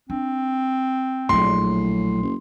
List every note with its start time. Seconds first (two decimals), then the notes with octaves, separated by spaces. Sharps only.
0.10 C4 D4
1.29 A#1 A2 F#3 C6
2.22 F#1